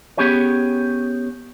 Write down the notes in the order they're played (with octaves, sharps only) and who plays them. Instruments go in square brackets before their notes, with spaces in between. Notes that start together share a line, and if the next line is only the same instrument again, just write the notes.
[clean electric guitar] B3 C#4 G4 G#4 C#5